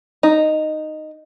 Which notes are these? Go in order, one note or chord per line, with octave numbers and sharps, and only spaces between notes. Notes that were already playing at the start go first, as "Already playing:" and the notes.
D#4